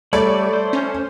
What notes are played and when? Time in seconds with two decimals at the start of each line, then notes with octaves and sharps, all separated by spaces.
0.13 G3 A3 C#5 D5 B5
0.53 C5
0.73 C#4